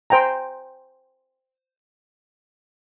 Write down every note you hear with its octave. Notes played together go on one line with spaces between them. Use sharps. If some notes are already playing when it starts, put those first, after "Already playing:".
C5 G5 G#5 A#5